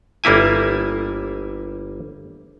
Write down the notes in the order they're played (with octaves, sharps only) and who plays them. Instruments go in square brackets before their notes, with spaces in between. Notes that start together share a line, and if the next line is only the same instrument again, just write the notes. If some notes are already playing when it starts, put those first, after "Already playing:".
[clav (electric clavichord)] G1 G3 A#3 E4 G#5